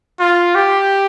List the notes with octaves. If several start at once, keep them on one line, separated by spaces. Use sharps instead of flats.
F4
G4